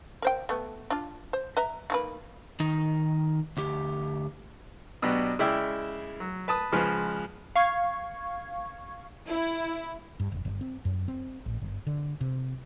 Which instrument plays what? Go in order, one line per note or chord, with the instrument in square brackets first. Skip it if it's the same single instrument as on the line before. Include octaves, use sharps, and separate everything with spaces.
[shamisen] A#4 C5 G5
A3 B3
D4 F4
C5
B4 E5 A#5
D#3 A#3 B4
[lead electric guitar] D#3 D#4
D2 G4
[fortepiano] B2 F#3 B3 D4 G4
C#3 G#3 E4 D5 E5 G5
F#3
B4 A5 D#6
C#2 C#3 F3 G#3 B4 C6
[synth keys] F5 C#6 G#6
[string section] E4
[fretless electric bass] G2
F1
G1
C4
F#2
C4
A1
G1
D3
C3